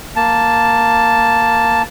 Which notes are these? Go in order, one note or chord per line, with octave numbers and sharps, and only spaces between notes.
A#3 A5